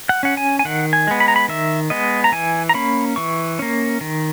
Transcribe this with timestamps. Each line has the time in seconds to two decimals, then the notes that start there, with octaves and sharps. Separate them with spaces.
0.09 F#5
0.23 C#4 F#5
0.37 G#5
0.59 G#5
0.65 D#3 F#5
0.93 G#5
1.07 G#3 B3
1.20 B5
1.28 A#5
1.36 B5
1.48 D#3 E5
1.90 G#3 B3 D#5
2.24 A#5
2.32 E3 G#5
2.69 A#5
2.74 A#3 C#4 B5
3.16 E3 C#6
3.59 A#3 C#4
4.01 D#3